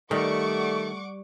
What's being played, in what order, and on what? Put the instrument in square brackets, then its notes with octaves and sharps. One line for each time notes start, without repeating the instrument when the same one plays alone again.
[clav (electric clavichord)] D#3 [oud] G3 [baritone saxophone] A3 [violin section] F#5 C#6 D6